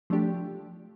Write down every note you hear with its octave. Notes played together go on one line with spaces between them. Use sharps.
F3 A3 D4 G4